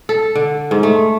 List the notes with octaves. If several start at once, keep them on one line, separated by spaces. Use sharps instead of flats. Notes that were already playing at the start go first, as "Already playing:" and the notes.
A4
D3
G#2
A3